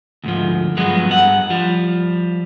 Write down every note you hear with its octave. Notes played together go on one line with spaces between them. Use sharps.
D2 G#2 F3
G2 F3 F#3 G#3 B3
G2 F#5
F3 G3